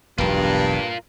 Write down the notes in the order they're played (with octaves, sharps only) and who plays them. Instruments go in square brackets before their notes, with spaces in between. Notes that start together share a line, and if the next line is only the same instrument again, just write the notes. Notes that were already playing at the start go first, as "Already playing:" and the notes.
[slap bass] E1 B1 [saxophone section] G2 [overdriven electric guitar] F4 A#4